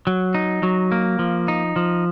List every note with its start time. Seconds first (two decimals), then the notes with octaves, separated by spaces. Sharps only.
0.07 F#3
0.35 D#4
0.63 F#3
0.92 A#3
1.19 F3
1.48 D#4
1.76 F3